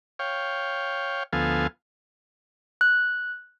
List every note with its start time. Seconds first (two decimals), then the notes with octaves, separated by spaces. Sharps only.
0.19 C#5 F5 G5
1.33 D2 F3 B3 A4 F5 G#5
2.81 F#6